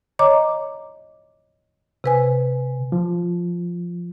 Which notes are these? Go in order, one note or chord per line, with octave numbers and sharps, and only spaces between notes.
C#5 D#5 A#5 D6
C3 B4 G#5
F3